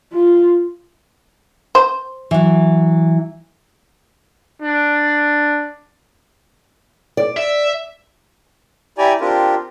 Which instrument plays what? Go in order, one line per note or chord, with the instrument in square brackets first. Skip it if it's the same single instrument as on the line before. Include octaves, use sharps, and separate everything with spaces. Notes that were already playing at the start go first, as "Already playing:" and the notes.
[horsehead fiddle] F4
[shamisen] C5
[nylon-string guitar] E3 F#3
[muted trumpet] D4
[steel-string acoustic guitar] D5
[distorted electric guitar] E5
[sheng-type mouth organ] E4 G4 D5 G#5 A#5
C4 D4 F4 G4 A#4